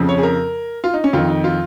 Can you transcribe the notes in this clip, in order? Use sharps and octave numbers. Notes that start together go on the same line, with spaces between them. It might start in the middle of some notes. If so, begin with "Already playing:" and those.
Already playing: F2 C#3 F3
C#5
G#4
A#4
F4
D#4
C#4
F2 D#3 F4
D#4
F4